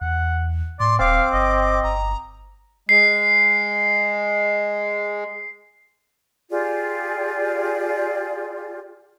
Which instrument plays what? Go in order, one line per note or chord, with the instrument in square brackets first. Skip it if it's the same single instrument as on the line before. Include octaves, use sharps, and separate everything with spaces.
[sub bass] E2 [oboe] F#5
[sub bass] A2 [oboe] D5 [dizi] C6
[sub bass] D#1 [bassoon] C4 [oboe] F5 [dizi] D6
[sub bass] G1 [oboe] D#5
[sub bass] G1 [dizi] A#5
[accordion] G#3 [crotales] C7
[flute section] F4 G4 G#4 D5